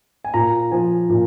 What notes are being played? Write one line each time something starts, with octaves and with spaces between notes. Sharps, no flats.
G#5
A#2 A#5
F3 G#5
A#2